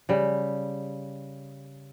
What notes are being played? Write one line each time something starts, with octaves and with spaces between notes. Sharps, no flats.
C#3 G3